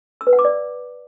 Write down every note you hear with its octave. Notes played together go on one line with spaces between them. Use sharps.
E6
B4
F#5
D6
D5